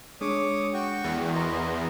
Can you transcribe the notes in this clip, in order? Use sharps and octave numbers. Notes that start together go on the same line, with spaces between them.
G#3 D4 G#4 C#5 D6 D#6
F#4 G5 C#6
E2
F#4 A#4 D#5 C6